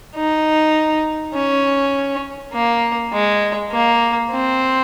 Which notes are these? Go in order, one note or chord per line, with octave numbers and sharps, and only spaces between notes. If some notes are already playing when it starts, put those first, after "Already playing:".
D#4
C#4
A#3
G#3
A#3
C4